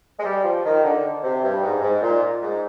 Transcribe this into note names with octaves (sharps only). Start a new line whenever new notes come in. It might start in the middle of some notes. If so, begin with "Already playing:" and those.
G#3
G3
F3
D#3
D3
C3
G2
G#2
G#2
A#2
G#2